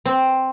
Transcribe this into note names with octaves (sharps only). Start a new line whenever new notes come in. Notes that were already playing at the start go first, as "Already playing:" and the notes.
C4